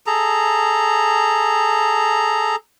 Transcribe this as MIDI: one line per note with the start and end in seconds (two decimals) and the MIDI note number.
0.07 2.56 68
0.07 2.56 69
0.07 2.56 82